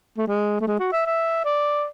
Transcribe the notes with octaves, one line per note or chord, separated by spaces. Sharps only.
A3
G#3
A3
G#3
F#4
E5
E5
D5